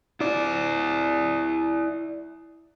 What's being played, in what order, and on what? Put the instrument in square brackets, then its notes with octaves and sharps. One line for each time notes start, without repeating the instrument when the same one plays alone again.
[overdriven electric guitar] E4 D5